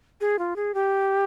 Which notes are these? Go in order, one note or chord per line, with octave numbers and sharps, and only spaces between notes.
G#4
F4
G#4
G4